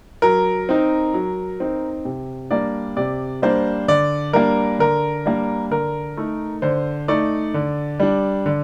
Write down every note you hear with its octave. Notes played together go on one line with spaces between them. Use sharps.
F#3 A#4
C4 D#4
F#3
C4 D#4
C3
G3 A#3 D4 D5
C3 D5
G3 A#3 D4 C5
D3 D5
G3 A#3 D4 A#4
D3 A#4
G3 A#3 D4
D3 A#4
A3 D#4
D3 C5
A3 D#4 D5
D3
G3 D4
D3